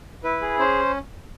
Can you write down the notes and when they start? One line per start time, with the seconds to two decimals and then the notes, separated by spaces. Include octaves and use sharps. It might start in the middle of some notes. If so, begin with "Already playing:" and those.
0.24 E4 B4
0.42 G#4
0.59 C#4 C5